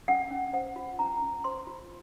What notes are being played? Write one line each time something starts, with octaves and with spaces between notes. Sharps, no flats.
C#4 F#5
C#4
C5 F#5
F4
C#4 A#5
C#4
C5 C6
F4